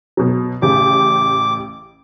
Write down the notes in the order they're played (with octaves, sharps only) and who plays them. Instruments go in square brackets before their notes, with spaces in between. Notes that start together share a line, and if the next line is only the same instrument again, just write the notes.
[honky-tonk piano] B2 F#3
[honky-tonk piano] A1 C#3 G4 [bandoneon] D6